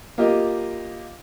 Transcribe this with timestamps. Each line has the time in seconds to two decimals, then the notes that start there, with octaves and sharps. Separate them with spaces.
0.18 A#3 F4 G4 D#5